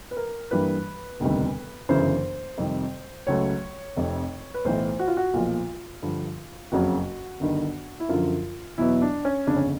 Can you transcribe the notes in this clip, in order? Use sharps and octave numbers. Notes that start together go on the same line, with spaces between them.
B4
A#4
G2 E3 G3 A#3 B4
E1 D2 C3 D#3 G3
G1 F#2 C#3 E3 C5
F2 C3 D#3 G3
C#2 C#3 F#3 A3 C#5
F1 F2 C3
B4
B1 A2 E3 C5
F#4
F4
F#4
B1 A#2 F3 F4
G2 D3 F3
F#1 F2 C#3 F#3 F#4
G1 G2 D#3
E4
F#2 D3 F3 F4
E2 B2 F#3 B3 E4
D4
C#4
G1 F2 C#3 D4
C#4